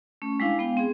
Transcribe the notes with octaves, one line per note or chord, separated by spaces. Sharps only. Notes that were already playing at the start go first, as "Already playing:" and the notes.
A3 C#4
G3 G#3 D4 E4 F5
G#3 B3 F5 G5
C4 G#4